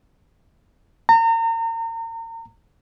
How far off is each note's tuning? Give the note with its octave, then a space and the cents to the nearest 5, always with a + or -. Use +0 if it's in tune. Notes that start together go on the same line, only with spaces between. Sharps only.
A#5 -35